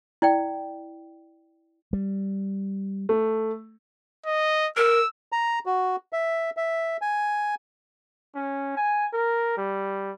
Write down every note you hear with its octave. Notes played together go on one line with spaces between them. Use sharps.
E4 D5 G5
G3
A3
D#5
A#4 E6
A#5
F#4
E5
E5
G#5
C#4
G#5
A#4
G3